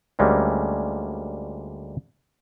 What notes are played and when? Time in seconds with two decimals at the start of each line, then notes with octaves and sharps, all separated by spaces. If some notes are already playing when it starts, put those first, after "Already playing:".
0.19 D2 G3 G#3 A#3 C#4